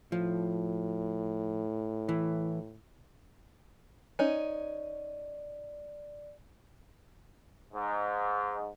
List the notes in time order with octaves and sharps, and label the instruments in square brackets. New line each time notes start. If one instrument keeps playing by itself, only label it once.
[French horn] A2 [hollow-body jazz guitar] F3
[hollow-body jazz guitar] E3
[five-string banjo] C#4 D#4 [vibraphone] D5
[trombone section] G#2